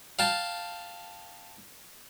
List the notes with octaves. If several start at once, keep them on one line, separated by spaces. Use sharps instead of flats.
F5 G5 A5